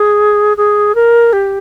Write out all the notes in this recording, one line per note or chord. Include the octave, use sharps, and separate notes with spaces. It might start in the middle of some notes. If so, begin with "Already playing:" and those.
Already playing: G#4
G#4
A#4
G4